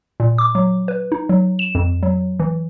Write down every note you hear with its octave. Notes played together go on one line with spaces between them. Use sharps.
A#2
D6
F#3
B4
D#4
F#3
E7
F2
F#3
E3